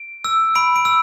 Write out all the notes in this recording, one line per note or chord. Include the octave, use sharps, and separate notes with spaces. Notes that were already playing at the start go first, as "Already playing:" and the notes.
Already playing: D7
E6
B5 D7
D7
E6